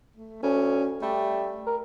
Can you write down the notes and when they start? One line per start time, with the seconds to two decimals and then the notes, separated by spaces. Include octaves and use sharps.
0.16 A3
0.43 D2 C#4
1.02 G3 A3
1.67 A#4